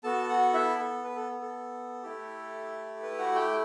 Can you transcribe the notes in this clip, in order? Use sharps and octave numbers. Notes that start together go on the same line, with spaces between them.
B3 F#4 A4 A5
F#4 F#5
E4 E5
A4
B4
A4
A4
A3 E4 G4
B4
F#4 F#5
G4 G5